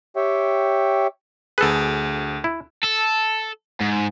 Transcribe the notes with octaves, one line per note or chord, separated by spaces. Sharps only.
G4 C#5 E5 G5
D2 G#4 A4 B4
E4
A4
G#2